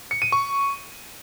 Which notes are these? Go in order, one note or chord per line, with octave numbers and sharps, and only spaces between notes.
C#7
D#7
C#6